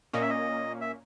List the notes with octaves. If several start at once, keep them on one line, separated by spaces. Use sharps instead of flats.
A#2 A#3 C#4 D#5
E5
D#5
E5